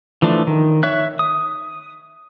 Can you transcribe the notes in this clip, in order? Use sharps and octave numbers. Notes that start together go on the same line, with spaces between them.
E3 F3 A3 D4
D#3
C#5 E5 F#6
D#6